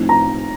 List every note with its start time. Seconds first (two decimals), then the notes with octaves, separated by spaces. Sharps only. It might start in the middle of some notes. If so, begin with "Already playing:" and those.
Already playing: A2 F3 C4 D#4
0.09 A#5